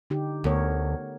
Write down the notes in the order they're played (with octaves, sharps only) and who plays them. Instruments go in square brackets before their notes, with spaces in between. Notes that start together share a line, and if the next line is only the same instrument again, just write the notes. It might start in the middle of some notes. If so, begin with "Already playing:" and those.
[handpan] D3 D#4 G4
[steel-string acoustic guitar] D2 [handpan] B3 A#4 C#5